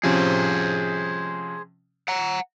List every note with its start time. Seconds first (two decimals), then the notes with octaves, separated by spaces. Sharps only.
0.03 C3 F3 C#4 G#4 C5
2.08 F#5 A#5